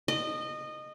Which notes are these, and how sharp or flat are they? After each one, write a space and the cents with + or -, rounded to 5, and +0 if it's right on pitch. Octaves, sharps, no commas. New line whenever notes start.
D#5 -20